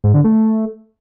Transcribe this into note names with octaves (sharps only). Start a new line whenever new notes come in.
G#2
D3
A3